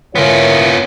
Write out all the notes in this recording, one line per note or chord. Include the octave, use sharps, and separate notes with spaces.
B3 E4 F4 A#4 C#5